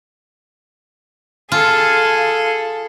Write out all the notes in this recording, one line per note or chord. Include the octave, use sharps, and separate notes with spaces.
F4 G#4 A4